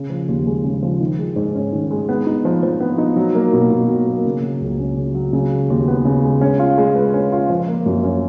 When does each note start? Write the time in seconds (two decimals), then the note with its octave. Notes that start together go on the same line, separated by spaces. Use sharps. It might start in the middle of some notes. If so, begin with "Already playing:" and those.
Already playing: C#3
0.10 F3
0.28 D#2
0.47 G#3
0.64 C#3
0.83 F3
1.01 D#3
1.19 G#3
1.36 G#2
1.55 C#4
1.72 D#3
1.91 G#3
2.09 B3
2.27 D#4
2.45 F3
2.63 F3
2.80 B3
2.98 D#4
3.16 F#3
3.35 A#3
3.53 B2
3.71 B2
3.90 F#3
4.07 A#3
4.25 C#3
4.43 F#3
4.61 C#2
4.79 C#4
4.97 C#3
5.15 F#3
5.33 C#3
5.52 G#3
5.70 D#2
5.88 B3
6.05 C#3
6.24 G#3
6.41 C#4
6.59 F4
6.78 G#3
6.96 B4
7.14 C#4
7.32 F4
7.50 F3
7.68 A#3
7.86 F#2
8.04 C#4